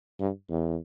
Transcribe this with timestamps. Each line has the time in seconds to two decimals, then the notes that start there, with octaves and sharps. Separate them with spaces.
0.20 G2
0.50 E2